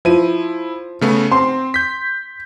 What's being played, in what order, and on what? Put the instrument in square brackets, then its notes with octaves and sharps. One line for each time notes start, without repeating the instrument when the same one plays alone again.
[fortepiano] F3 [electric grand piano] E4 D#7
[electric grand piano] C#3 A3 B3
[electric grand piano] C4 [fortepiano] C6
[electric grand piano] G6 B6